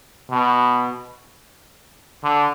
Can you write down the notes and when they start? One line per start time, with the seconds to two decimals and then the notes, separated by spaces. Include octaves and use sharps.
0.30 B2
2.23 D3